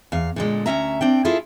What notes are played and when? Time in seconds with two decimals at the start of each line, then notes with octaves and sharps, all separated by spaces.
0.12 E2 F5
0.36 A#2 D3 G#3
0.66 D2 A3 C#4 E5 A#5
1.01 C4 D4 G5
1.25 E4 F4 G#4 A4